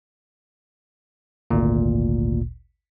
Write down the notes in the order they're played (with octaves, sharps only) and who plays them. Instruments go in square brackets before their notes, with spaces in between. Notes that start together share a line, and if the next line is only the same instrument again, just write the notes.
[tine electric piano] G#1 D2 A#2